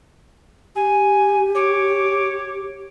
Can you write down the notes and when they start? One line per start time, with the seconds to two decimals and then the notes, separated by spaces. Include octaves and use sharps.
0.75 G4 G#5
1.54 C#5 D6